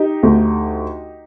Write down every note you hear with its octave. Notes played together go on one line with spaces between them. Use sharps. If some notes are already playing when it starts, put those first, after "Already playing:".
Already playing: D#4 G4
D2